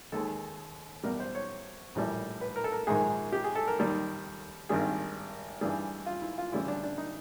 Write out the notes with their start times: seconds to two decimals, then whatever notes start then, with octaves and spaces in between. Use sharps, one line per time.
0.12 D#2 D#3 G#3 A4
1.03 E2 B2 G3 A#4
1.20 C5
1.35 C#5
1.95 A#1 A2 E3 G3
2.41 B4
2.56 A#4
2.64 A4
2.72 A#4
2.87 A#1 G#2 D#3 G#3 G#4
3.33 G4
3.44 G#4
3.55 A4
3.67 A#4
3.78 D#2 D#3 G3
4.69 G#1 G2 D#3 G3 G#4
5.61 G2 E3 G3 G#4
6.06 F4
6.22 E4
6.38 F4
6.52 D2 C#3 E3 G3 E4
6.68 D4
6.84 D4
6.98 D#4